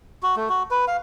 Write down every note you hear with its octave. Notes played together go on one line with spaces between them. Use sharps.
F#4
A3
F#4
B4
F5